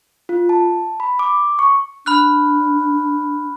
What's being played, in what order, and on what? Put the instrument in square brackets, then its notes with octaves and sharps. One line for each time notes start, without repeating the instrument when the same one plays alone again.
[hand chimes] F4
A5
B5
D6
C#6
[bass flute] D4 [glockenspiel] B5 F6 F#6